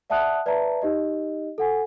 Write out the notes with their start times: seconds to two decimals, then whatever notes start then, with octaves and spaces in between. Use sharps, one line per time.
0.10 D5 E5 F#5 A5 D#6 F#6
0.46 B4 D5 E5 A5 A#5
0.82 D#4 G4 D#5
1.58 A4 F#5 G#5